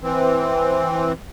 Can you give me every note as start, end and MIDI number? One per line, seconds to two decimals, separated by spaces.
0.01 1.12 52
0.01 1.12 60